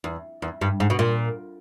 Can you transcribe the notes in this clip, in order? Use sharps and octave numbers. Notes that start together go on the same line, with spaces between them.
E2
E2
G2
G#2
B2
A#2